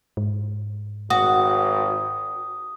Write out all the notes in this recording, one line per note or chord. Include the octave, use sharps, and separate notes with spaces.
G#2
G#1 F#4 D#6